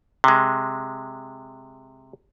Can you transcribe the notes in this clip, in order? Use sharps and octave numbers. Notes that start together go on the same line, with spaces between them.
C3 G#3